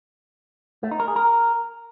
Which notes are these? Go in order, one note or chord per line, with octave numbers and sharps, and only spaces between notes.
A3
D#4
A#4
G#4
A#4